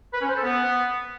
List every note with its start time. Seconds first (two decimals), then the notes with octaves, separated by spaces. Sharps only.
0.14 B4
0.21 C#4
0.29 C5
0.36 A4
0.44 B3